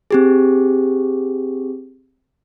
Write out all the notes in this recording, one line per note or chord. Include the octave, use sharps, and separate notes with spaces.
C4 G4 G#4